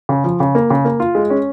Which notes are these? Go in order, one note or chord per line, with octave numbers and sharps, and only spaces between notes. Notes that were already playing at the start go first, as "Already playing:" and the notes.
C#3
F3
C#3
A#3
C#3
A#3
F4
G#3
C#4